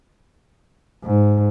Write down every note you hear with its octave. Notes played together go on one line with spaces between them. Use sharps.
G#2